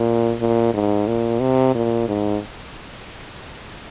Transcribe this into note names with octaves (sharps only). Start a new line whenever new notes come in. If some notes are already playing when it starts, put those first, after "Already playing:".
Already playing: A#2
A#2
G#2
A#2
C3
A#2
G#2